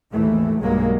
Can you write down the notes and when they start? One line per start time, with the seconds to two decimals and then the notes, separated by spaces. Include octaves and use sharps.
0.12 G#1 D#2 E3 A3
0.60 B1 G2 F#3 G#3 A#3